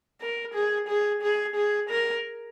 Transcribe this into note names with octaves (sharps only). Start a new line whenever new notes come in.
A#4
G#4
G#4
G#4
G#4
A#4